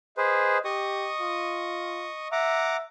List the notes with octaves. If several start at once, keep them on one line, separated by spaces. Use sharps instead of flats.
G#4 B4 C5 D#5
G4 D#5 C#6 D#6
F4
E5 F#5 A#5 D6